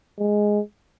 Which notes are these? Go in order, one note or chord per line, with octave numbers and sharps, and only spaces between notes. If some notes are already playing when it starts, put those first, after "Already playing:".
G#3